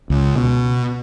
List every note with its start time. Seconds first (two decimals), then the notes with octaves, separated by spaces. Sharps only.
0.10 C#2
0.36 B2